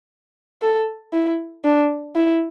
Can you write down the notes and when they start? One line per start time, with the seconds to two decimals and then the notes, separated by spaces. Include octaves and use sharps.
0.62 A4
1.13 E4
1.64 D4
2.15 E4